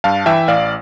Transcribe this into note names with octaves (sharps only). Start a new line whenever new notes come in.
G2 F5 A5
E3 E5 G5
A1 D5 F5